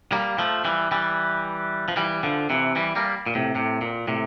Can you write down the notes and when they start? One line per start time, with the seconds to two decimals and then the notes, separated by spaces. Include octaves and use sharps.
0.12 G3 A#3
0.39 F3 A3
0.65 E3 G3
0.92 E3 G3
1.88 F3
1.96 E3 G3
2.23 D3 F3
2.50 C3 E3
2.76 E3 G3
2.96 G3 A#3
3.26 A#2
3.35 A2 C3
3.55 A2 C3
3.81 A#2
4.08 A2 C3